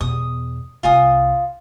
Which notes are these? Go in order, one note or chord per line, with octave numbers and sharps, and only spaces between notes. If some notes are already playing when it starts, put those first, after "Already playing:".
E2 B2 D#6
C2 C3 F4 G#5 D#6